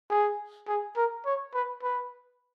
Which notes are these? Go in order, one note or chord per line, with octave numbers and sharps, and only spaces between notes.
G#4
G#4
A#4
C#5
B4
B4